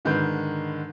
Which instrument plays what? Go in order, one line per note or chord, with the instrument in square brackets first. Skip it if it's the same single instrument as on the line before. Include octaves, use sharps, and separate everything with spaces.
[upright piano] G#2 D3 D#3 G#3 B4 G6